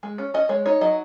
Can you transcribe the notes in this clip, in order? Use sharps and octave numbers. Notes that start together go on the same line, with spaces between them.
G#3
C#4
C#4 D#5
G#3 C#5
D#4 C#5
F#3 D#5